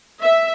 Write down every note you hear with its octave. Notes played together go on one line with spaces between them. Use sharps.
E5